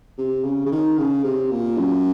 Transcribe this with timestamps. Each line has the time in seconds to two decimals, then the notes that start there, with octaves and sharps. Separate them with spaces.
0.18 C3
0.44 C#3
0.66 C#3
0.72 D#3
0.98 C#3
1.24 C3
1.51 A#2
1.78 F#2